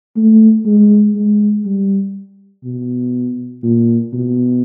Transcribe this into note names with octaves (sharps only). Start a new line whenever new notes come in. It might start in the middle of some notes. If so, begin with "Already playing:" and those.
A3
G#3
G#3
G3
B2
A#2
B2